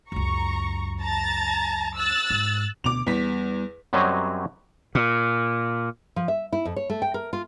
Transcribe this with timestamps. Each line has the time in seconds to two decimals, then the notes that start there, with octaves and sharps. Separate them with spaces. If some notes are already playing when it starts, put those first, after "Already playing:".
0.12 C#2 F#2 A#5 C#6
1.02 A5 A#5 A6
1.97 E6 F#6 A6
2.30 G#2
2.84 D2 B2 D6 F7
3.06 E2 G3 B3 B6
3.93 F#2 F#3 G3 C4 C#5 D#5
4.95 A#2
6.16 F3
6.28 E5
6.53 E4
6.65 F2
6.76 C#5
6.90 A3
7.02 G5
7.14 A#4
7.33 F4